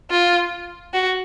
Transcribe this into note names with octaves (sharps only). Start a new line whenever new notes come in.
F4
F#4